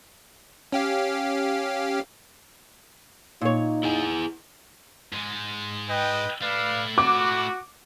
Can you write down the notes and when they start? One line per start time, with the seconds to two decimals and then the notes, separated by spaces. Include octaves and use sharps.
0.72 C#4 G4 F5
3.41 A#2 D#4 C#5
3.83 E4 G#4 G#5
5.12 G#2 G#3
5.89 B4 D#5 G5
6.42 A3 E4 B4 D5 F5
6.98 F#4 D6